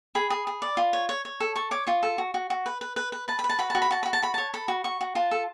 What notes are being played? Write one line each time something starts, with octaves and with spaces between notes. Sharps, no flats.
G#4 B5
G#4
G#4
D5
F4
C#5
C#5
C#5
A4
A4 C#6
C#5 D6
F4 C#6
A4
F#4
F#4
F#4
B4
B4
B4
B4
B4 A5
B5
B4
A5
F#4 B5
F#4 A5
B5
F#4 A5
F#4 B5
A5
F#4 B5
C#5 A5
A4 B5
F#4
F#4 C#6
F#4
F4 A5
A4